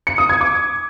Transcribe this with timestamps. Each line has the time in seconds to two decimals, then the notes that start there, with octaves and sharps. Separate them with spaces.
0.07 C#7
0.18 D#6
0.29 G#6
0.41 D6